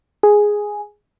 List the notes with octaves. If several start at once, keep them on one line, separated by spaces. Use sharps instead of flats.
G#4